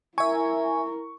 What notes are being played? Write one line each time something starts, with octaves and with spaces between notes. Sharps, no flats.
E4 A#4 E5 G#5 C#6